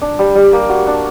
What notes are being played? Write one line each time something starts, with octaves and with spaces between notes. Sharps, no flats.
D4
G3
G3
A#3
F#4
D4